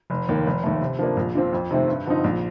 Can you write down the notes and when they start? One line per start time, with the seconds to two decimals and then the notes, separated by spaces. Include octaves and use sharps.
0.10 F1
0.29 D#2 D#3 A#3
0.46 F1
0.64 D#2 D#3 A3
0.81 C3
0.99 F3 A#3 D4
1.17 A#1
1.35 A#2 F3 C4
1.53 F2
1.71 C3 D#3 A3 C4
1.88 G2
2.06 D3 F3 C4 D#4
2.24 A#1